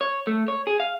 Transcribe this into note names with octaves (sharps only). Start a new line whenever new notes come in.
C#5
A3
C#5
G#4
F5